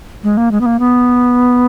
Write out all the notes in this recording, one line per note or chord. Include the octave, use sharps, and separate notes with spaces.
G#3
A#3
G#3
B3
A#3
B3